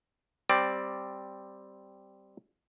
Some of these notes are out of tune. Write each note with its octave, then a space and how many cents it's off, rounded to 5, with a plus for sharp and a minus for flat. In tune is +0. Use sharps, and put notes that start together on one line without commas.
G3 +0 C4 +0 D5 +0